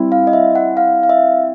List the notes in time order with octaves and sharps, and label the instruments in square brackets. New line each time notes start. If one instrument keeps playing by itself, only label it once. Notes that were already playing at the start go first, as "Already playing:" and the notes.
Already playing: [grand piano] G3 C4 E4
[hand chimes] F5
D#5
E5
F#5
F5
F5
E5